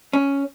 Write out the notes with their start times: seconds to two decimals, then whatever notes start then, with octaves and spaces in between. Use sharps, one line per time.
0.13 C#4